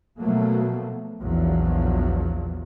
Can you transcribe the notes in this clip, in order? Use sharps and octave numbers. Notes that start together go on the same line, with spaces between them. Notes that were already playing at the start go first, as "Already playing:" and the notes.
B2 F3 F#3 A3 A#3
A#1 E2 F3 F#3